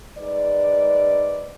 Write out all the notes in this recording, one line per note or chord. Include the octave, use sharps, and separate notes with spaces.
G#2 B4 D5